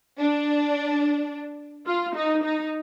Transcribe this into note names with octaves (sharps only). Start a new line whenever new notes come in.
D4
F4
D#4
D#4